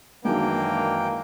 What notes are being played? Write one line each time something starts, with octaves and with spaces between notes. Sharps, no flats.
F#2 D#3 E3 F#3 G#3 A#3 D4 G5